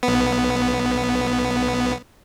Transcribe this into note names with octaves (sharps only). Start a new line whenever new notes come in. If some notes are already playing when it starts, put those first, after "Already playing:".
B1 B3